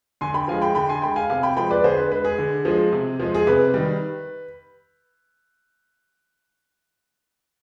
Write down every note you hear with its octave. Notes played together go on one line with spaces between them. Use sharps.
D3 G#5 C6
G5 B5
F3 G#3 F5 G#5
G5 B5
D3 G5 B5
G#5 C6
G#3 G5 B5
F5 G#5
C3 F5 G#5
G5 B5
F3 G#3 G5 B5
B4 D5
D3 G#4 C5
B4
G#3 B4
G#4
D3
F3 G#3
C3
F3 G#3
G#4
C3 B4
D#3 G3